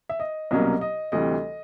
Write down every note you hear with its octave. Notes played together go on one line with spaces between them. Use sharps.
E5
D#5
C2 B2 F#3 A#3 C#4 D#5
D#5
D2 C3 E3 G3 D#5